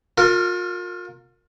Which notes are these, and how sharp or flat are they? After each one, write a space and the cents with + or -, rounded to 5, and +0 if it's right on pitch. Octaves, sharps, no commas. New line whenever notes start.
F4 +35 A#4 -20